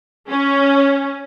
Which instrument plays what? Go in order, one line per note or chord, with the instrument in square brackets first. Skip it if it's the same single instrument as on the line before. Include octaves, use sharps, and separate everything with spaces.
[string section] C#4